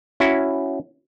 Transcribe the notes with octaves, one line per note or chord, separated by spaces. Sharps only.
C#4 E4 F#4